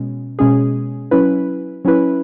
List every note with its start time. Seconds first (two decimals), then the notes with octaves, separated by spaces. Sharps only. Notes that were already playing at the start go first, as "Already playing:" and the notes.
Already playing: B2 G#3 C#4
0.39 B2 G#3 C#4 G#4
1.11 F#3 C#4 E4 B4
1.85 F#3 C#4 E4 B4